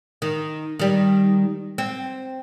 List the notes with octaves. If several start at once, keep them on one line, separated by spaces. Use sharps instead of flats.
D#3
D#3 G3
C4